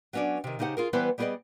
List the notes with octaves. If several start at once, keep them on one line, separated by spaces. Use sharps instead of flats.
F#3 B3 C#4 D4 D5
C3 D#3
C#3 D#4 G4 C5 F#5
F4 G#4 A#4
E3 G3 B3 E4 B4 C5
G3 B3 G#4 A#4 D5 D#5